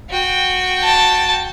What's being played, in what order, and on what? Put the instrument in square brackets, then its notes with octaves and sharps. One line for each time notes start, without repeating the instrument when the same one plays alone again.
[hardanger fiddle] F#4 G5
[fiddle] A5